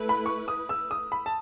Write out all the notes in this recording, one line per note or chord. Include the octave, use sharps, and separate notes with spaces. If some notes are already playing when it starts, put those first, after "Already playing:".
Already playing: A3 E4 B4
B5
C#6
D#6
E6
D#6
B5
A5